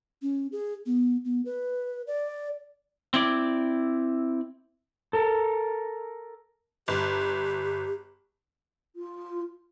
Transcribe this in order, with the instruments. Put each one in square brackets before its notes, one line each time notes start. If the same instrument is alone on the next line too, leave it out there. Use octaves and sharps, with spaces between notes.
[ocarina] C#4
G#4
B3
B3
B4
D5
[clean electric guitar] C4 E4 D5
[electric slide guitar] A4 A#4
[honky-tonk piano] G1 [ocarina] G4
[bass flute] F4